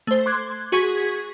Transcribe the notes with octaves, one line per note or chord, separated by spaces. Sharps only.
A3 C5
C6 D6 F#6 G#6
F#4 G#4 C#6 G#6 B6